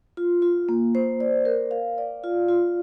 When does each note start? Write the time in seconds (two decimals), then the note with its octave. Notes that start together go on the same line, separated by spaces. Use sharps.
0.17 F4
0.42 F4
0.69 A#3
0.95 C5
1.20 D5
1.45 A#4
1.71 F5
1.98 D5
2.24 F4
2.48 F4